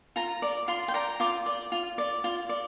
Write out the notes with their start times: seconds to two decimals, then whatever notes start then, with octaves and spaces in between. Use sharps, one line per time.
0.16 F4 A#5
0.42 D5
0.68 F4 C6
0.88 G5
0.94 D5 A#5
1.20 F4 D6
1.46 D5
1.72 F4
1.98 D5
2.24 F4
2.49 D5